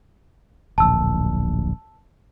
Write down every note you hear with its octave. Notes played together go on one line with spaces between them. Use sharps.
D1 A#1 A5 E6